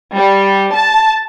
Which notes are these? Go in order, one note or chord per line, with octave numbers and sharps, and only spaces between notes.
G3
A5